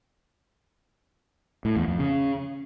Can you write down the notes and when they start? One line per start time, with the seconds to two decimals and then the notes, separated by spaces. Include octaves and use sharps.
1.65 A2
1.76 E2
1.88 F2
1.99 C#3